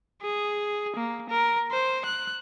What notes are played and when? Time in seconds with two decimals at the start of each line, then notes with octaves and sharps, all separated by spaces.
0.22 G#4
0.96 A#3
1.29 A#4
1.71 C5
2.05 F#6